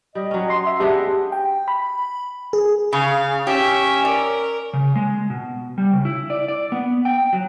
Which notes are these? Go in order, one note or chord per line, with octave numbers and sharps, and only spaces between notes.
G3 D#5
F#3 C#4
C6
E5
G#3 B3 D4 G4
G5
B5
G#4
C#3 F5
C#4 G4 E5
A#4 D5
C#3
G#3
B2
G3
C#3
E4
D5
D5
B3
G5
F#3